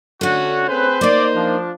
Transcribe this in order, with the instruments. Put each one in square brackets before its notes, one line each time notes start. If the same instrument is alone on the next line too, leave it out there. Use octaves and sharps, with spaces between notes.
[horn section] D3 F#4 [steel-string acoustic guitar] A3 C#4
[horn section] C4 G#4 B4 [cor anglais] C5
[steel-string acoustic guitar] A#3 D#4 [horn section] D5
[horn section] F3 D4